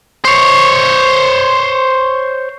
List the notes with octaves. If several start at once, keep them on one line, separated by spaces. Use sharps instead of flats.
C5 C#5